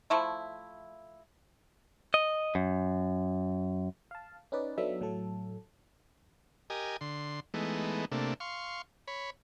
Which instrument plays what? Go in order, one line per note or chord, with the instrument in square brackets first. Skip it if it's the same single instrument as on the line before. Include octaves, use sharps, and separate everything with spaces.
[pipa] F3 A3 E4
[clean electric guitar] D#5
F#2
[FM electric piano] F5 A5
C#4 D#4 B4 D5
F#3 B3 D4 D#4 A4 E5
A2 F#3 A3 A4
[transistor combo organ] G4 A#4 D#5 G#5
D3 C6
E3 G#3 A3 B3 D#4
C3 A3 A#3 D4
F5 C6 C#6
C#5 B5